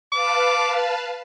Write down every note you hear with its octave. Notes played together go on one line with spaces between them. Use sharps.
B4 F5 A5 D6